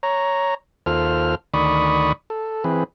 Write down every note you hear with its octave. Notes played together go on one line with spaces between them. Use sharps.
C#5 A#5
D#2 F4 A4 C5 F6
D2 D#3 D5 B5 C#6 D#6
A4
E3 C4 G#4 B4